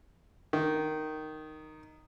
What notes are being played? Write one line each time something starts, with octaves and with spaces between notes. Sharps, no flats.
D#3